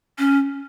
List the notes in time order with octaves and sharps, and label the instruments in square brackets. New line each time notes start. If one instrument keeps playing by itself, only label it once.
[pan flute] C#4